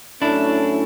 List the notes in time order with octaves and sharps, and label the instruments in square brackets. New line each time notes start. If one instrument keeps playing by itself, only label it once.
[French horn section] A2 F#3 A3 C#4 [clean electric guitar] D4 E4